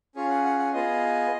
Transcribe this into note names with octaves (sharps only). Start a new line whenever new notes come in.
C#4 F4 G#4 C#5
F#5
F#5
F#5
B3 F4 G#4 D#5